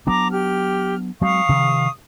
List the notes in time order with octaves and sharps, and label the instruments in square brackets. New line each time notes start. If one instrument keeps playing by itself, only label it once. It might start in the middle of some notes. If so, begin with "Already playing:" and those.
[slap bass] F#3 B3 D4 [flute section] A#5 D6
[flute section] G4 F6
[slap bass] F#3 G#3 C4 [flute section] F5 C#6 D#6
[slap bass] C3 D#3 F3